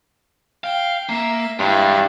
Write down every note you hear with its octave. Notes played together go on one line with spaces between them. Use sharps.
F5 G5
A#3 E5
G2 G#3 D4 E4